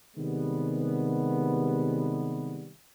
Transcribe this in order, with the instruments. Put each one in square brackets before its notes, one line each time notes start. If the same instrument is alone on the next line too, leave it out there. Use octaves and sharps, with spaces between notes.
[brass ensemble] C3 D#3 G3 G#3 B3